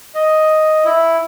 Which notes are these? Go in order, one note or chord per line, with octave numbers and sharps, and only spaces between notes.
D#5
E4